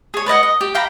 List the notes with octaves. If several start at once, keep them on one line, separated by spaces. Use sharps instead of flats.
G#4 C#5
B4 D5 D#5 F#5
D#5
G4
F5 G5 A#5 B5